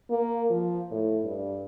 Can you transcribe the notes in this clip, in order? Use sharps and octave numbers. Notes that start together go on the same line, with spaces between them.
A#3
F3
A2
G2